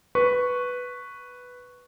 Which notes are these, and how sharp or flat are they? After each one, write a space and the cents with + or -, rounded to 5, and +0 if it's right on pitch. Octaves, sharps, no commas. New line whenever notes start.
B4 +0 C#6 +0